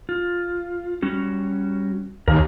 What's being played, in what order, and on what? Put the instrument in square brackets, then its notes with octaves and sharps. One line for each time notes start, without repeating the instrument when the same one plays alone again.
[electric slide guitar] F4
G3 C#4 F#4
[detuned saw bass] D#2 [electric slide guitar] A#4 G#5